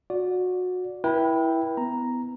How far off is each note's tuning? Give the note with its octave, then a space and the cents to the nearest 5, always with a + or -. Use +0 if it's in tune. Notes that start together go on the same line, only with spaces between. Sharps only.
F#4 -25 D5 -10
E4 +0 B4 -45 G5 +0
B3 +25 A#5 +0